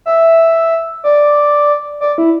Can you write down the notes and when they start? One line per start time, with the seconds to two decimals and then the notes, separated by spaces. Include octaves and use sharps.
0.06 E5
1.04 D5
2.01 D5
2.18 E4